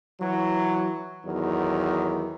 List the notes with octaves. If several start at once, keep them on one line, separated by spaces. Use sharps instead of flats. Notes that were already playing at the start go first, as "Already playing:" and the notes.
E3 F#3
E2 D#3 F#3